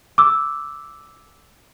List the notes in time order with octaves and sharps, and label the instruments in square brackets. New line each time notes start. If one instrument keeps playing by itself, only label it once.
[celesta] D6 E6